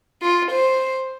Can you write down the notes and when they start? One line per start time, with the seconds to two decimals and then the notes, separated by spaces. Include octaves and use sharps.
0.22 F4
0.51 C5